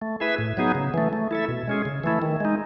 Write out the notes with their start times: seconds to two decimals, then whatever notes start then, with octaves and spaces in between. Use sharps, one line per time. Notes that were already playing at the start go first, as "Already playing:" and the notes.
0.02 A3
0.20 E4 G#4 B4 E5
0.38 A2
0.57 F#3 B3 D#4 G#4
0.75 C#3
0.94 E3 A3
1.13 A3
1.31 E4 A4 E5
1.48 B2
1.68 G#3 C#4 G#4
1.85 C#3
2.04 E3 A3 E4
2.22 D#3
2.40 G#3 D#4